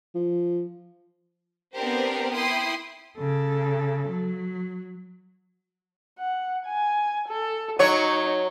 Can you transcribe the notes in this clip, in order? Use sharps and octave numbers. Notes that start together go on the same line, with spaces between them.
F3
B3 C4 D4 G4 A#4 C5
E4 G5 C6 D#6
C#3 A4
F#3
F#5
G#5
A4
F#3 D#4 C#5